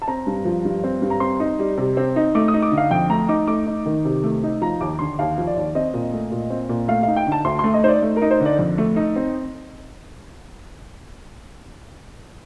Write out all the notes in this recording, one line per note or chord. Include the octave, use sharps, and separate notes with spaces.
A5
C4 A#5
G2
F3
G2
C4
G2
A#5
C4 C6
D#4
G3
C3
C4
D#4
A3 D6
D#6
D#4
D6
D3
F5
F2 G5
A3 A#5
D#4 D6
A3 D6
D#4
D#3
C3
A3
D#4
F3 A#5
D#2 D6
D3 C6
D#2 F5
F3
D5
D#2
C4 D#5
A#2
A3
A#2
C4
A#2
A3 F5
D#4 F5
G5
D3
A5
D2 C6
A3 C6
D#5
D#4 C5 D5
A3
A#4
D#4
C5
D3
D5
F2
A3
D#4
C4